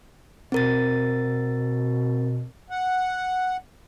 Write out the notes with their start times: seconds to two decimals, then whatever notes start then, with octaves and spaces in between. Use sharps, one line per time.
0.52 B2 C4 A#4 A6
2.70 F#5